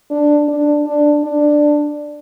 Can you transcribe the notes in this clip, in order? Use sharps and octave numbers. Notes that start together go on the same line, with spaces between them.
D4
D4
D4
D4